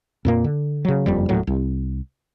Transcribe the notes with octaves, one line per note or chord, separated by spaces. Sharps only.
F2 A#2 A#3
D3
C#3 F#3
F#1 F2 G3
D#1 A2 F#3
C2